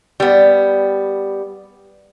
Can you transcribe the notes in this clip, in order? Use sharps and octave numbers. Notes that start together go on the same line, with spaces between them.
G3 B3